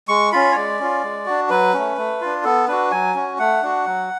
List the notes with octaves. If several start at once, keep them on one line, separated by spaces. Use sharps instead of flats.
G#3 C#6
C#4 F4 B5
C#5
G#3 D5
C#4 F4
G#3
D4 F#4
F#3 B4
A3 C#4
A3
D4 F4
B3 A4
D4 F#4 B4
F#3 G#5
C#4 F#4
A3 F#5
D4 F#4
F#3